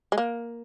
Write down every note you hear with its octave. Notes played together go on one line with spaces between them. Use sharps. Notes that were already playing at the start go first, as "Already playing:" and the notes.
G#3
A#3